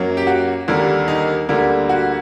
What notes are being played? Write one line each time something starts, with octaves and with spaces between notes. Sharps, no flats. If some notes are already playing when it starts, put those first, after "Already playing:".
Already playing: F#2 F#3 A#3
G4
F#4
D#2 D3 G3 A#3
D#4
D2 D3 G3 A#3
F#4